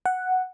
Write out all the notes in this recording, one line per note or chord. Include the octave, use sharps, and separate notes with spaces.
F#5